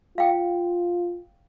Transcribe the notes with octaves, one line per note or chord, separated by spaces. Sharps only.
F4 F5 G5